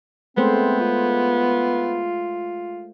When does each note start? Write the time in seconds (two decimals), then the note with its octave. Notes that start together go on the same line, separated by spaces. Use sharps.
0.37 G#3 A3 B3 C4 C5
0.80 F4